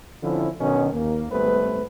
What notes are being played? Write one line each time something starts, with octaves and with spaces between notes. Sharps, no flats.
D3 F3 C4 C#4 E4
B2 D3 D#3 F#3 C#4
D#2 A#3
G#1 G3 A3 B3 B4 C5